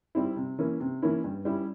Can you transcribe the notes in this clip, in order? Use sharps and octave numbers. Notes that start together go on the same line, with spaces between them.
G3 C4 E4
C3
E3 A#3 C#4 E4
C3
E3 A#3 C#4 E4
G2
G3 C#4 E4